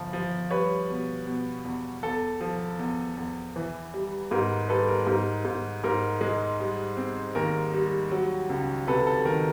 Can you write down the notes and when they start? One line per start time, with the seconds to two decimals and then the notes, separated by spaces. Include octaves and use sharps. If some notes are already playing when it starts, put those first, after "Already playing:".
Already playing: G1 F3
0.13 F3
0.51 G3 B4 C#5
0.90 B2
1.27 B2
1.64 E2
2.03 E2 A4
2.41 F3
2.79 E2
3.17 E2
3.56 E3
3.94 G3
4.31 G#2 A#4
4.69 G3 A4 B4
4.88 A#4
5.07 G#2 A#4
5.45 G#2
5.84 G#2 A#4
6.21 G#3
6.60 G3
6.97 C4
7.35 D#2 A#4
7.74 G3
8.11 F#3
8.50 C#2
8.87 C3 A4 B4
9.07 A4
9.25 D#3 A#4